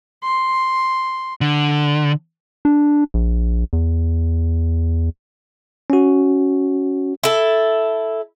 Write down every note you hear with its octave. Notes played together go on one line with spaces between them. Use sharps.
C6
D3
D4
A#1
E2
C#4 F#4
E4 A4